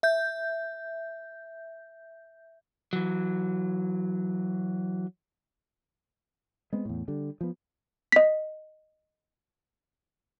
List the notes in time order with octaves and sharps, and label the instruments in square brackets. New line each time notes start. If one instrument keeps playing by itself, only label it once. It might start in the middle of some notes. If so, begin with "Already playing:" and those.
[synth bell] E5 G6
[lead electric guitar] E3 F#3
[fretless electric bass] G#3 B3 C4
E2 A2
D3 G3
F3 B3
[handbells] D#5 B6